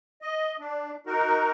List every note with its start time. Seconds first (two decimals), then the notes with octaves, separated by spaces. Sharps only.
0.22 D#5
0.60 D4
1.06 D#4 F#4 A#4